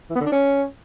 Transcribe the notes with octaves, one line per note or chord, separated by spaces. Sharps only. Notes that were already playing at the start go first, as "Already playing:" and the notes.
E3
B3
D3
D4
C#4